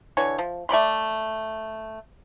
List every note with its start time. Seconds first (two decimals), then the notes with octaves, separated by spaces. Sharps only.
0.17 D3 E3 C#5
0.38 F3
0.69 A3 D5 B5 C6